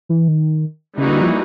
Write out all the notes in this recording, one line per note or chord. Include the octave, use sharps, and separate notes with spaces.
E3
D#3
C#3 E3 G3 A#3 D#4 F#4
D3
F3